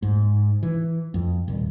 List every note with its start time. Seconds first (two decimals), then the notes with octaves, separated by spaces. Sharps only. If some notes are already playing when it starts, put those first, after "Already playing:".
0.03 G#2
0.63 E3
1.14 F2
1.48 D#1